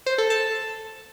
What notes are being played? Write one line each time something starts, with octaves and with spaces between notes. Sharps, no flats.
C5
A4
A5